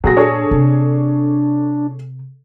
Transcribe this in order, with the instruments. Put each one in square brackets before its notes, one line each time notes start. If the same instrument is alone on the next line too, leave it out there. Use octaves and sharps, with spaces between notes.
[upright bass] A#2 [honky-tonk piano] F#3 G#4 A#6
[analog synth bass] D4 [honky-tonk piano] G#4 A4 C#5
[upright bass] C3